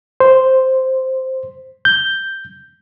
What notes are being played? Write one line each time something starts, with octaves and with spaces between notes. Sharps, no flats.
C5
G6